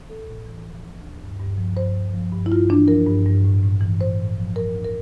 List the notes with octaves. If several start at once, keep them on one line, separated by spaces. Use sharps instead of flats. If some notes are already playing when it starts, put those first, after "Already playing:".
Already playing: E3
A2 A4
A2
E3
F3
D2
D2
G2
G2
F3
G2 C5
G2
F3
G2
E4
G2 F4
E3 D4
F3 A#4
G2
G2
A2
A2
E3
A2 C5
A2
F3
F3 A#4
D2
A#4